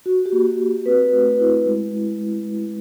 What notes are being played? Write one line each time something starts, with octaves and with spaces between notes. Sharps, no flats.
F#4
G4
A#3
F#4
C4 B4
A3
E4
G#3
E4